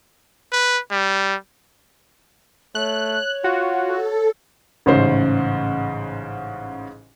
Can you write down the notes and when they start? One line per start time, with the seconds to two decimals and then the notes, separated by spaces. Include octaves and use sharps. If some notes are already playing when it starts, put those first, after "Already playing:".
0.52 B4
0.91 G3
2.75 A3 C#5 F#6
3.44 F4 F#4
3.84 A4
4.86 A1 G#2 C#3 C5